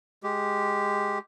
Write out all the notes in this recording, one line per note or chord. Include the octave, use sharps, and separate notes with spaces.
G#3 G4